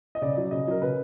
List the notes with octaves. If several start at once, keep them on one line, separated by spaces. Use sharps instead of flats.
D#5
C#3 D5
F#3
D5
C#3 D#5
F#3 A#4
C#3 B4